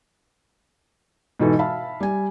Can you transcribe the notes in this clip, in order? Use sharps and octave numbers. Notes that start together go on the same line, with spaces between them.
G#2 B2 E3 A4
E5 F5 A5 B5
G3 G#5